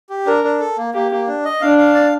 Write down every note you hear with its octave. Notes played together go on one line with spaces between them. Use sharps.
G4
D4 A#4
D4
A4
A#3
A#3 G4
A#3
D4
D#5
D4 F5
F5
D5